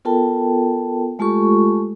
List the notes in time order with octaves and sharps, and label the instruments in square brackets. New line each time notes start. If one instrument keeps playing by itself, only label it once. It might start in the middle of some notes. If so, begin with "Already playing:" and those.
[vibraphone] B3 F4 A4 A#4 G5 A5
G#3 A3 F4 G4 A4 C#6